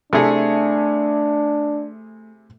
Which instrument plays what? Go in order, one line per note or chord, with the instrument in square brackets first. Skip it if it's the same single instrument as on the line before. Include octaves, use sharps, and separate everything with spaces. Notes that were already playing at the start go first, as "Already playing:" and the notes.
[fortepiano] C3 E4 G#4 [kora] A3 [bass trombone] D4